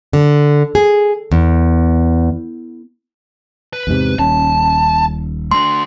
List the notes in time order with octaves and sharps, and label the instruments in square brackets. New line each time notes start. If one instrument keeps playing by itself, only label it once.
[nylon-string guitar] D3
G#4
E2
[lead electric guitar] B4
[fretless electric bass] E2 G#2 C3
[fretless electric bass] D#1 C#4 [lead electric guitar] A5
[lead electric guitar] A3 D4 [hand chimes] C6